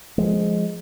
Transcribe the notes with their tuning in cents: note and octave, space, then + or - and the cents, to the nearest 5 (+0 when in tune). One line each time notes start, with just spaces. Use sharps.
F3 +0 G#3 +0